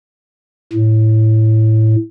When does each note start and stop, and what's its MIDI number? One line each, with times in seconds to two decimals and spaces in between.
0.73 1.96 45